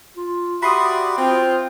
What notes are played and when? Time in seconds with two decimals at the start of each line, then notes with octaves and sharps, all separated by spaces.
0.17 F4
0.63 F#4 G4 D5 E5 B5 C6 D#6
1.18 C4 F4 G5